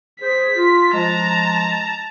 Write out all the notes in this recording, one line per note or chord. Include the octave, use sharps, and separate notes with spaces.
G#4 C5 B6
F4
F3 G#3 A5 A#5